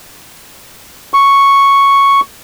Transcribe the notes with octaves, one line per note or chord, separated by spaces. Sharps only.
C#6